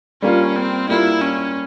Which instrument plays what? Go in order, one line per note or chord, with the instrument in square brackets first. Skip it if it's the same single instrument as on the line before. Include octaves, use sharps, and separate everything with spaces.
[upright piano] G3 A#3 F4 [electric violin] C#4
[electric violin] C4
[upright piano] G3 A#3 F4 [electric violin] E4
[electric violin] C#4